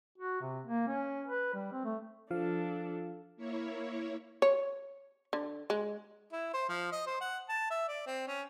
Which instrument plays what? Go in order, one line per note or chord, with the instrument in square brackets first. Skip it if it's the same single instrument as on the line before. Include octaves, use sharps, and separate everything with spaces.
[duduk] F#4
C3
A#3
C#4
B4
G3
C4
A3
[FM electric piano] F3 F5 [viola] D4 A4
[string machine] A#3 E4 C#5
[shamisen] C#5
D3
G#3
[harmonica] E4
C5
F3
D#5
C5
F#5
A5
E5
D5
C4
C#4